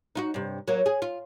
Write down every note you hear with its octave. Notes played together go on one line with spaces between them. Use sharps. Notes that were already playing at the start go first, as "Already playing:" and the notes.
D#4 F4 F#4
G2 C3
F#3 A#3
G#4
F4